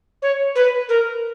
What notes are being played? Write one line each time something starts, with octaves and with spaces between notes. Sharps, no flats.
C#5
B4
A#4